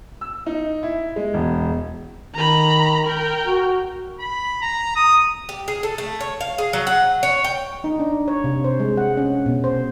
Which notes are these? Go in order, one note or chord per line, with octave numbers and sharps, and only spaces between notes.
E6
D#4
E4
G#3
E1
D#3 A#5 B5
A#4 G5
F#4
B5
A#5
D#6
G4
G#4
A4
A3
C#5
F5
G#4
F#3
F#5
C#5
G5
D#4
D4
C#5
C3
C5
G#3
F#5
C#4
B2
C5